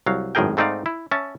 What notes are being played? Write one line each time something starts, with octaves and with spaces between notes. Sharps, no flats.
C2 F#3 F5
G#1 F#2 A2 G#4 A#4 G5
G#2 A3 C4 D#4 D5 F5
E4
C#4 E5 A5